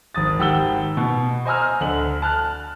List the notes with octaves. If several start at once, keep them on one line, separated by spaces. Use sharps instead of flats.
G#1 D#6 A6
G#1 G4 F#5 E6 G7
B2
C5 D#5 G#5 A#5 E6 F6
D2 D3 F#7
A5 F6 F#6